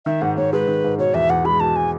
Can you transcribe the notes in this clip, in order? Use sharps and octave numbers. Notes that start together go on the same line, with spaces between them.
D#3 E5
G#2 F#5
G#2 C#5
G#3 B4
D#3
G#2
B2 C#5
E2 E5
E2 F#5
G#3 B5
B2 A5
G#5